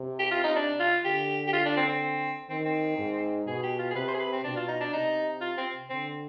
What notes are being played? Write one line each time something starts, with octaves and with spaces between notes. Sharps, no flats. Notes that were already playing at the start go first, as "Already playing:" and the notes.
Already playing: C3
G4
F4
D#4
D4
F4
D3 G4
G4
F4
D4
C4
C4
D#3 C4
C4
G#2
B2 G#4
G4
F4
G#4
C3 B4
C5
G#4
B4
C4
B2 D4
F4
D#4
D4
C3 D#4
F4
C4
D3 C4